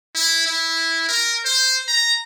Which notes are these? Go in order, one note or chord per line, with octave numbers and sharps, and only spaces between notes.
E4
E4
A#4
C5
A#5